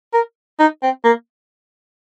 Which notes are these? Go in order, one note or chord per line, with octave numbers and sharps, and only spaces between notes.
A#4
D#4
C4
A#3